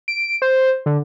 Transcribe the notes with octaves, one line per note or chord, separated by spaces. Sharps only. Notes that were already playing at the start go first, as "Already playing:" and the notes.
D7
C5
D3